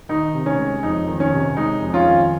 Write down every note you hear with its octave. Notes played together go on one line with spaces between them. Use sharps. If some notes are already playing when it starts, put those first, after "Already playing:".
D#3 D#4
C3
C#4
G#3
F2 D#4
D#3
C#4
C3
G#3 D#4
F2
C#4 F4
D#3